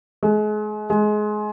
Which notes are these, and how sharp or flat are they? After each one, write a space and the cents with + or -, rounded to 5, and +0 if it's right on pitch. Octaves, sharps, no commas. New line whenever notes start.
G#3 +35
G#3 +25